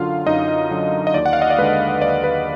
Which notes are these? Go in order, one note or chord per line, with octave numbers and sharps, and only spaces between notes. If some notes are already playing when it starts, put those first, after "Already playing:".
Already playing: F#2 D3 F#3 F4 F5
F#2 D#4 D#5
D3 F#3
D#5
D#2 D5
F#5
F5
D#5
D5
D3 G#3 B4
D#2 D5
B4